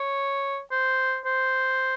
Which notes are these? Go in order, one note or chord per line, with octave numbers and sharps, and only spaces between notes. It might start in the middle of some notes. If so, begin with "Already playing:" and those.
Already playing: C#5
C5
C5